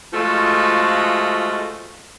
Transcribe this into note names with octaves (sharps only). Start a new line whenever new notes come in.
F3 G#3 A3 F4 F#4